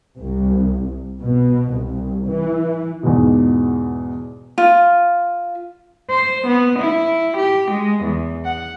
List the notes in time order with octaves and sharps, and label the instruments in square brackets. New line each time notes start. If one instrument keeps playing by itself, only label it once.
[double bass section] C2
B2
C2
E3
[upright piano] E2 G#2 B2
[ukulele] F4
[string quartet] C5
B3
E4
G4
G#3
E2
F#5